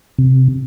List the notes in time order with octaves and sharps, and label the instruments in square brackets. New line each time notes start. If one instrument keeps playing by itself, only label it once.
[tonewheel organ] C3